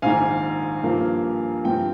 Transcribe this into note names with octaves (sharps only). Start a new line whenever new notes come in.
A#1 G#2 D#3 F5 G#5
G2 F3 A#3
G2 F3 C4 G5